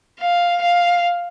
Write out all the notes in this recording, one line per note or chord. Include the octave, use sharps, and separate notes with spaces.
F5
F5